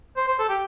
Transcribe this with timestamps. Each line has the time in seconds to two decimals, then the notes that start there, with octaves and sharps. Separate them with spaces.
0.17 C5
0.28 C5
0.39 A4
0.49 G4